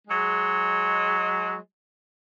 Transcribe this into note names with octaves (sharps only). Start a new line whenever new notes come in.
F#3 G#3